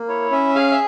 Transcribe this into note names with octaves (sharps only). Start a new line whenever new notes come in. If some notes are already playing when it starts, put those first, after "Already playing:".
Already playing: A#3
E4 C#5
C#4 E5
G#4 F5
E5